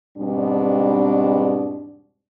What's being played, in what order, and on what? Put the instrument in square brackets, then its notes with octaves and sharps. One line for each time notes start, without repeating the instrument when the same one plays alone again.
[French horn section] E2 G#2 B2 G3 C4 D4